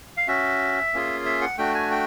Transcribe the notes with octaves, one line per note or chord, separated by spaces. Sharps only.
F5
C#4 F#4 E5
A#3 C#4 F4 G#4
E5
F#5
A3 D4 F#4 G5
G#5
G5